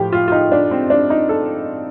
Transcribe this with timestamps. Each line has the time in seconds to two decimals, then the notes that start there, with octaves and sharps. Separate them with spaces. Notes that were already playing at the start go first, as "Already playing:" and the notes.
Already playing: A2 F3 G4
0.12 F4
0.28 F4
0.32 D#4
0.52 D4
0.71 C4
0.90 D4
1.10 D#4
1.29 A4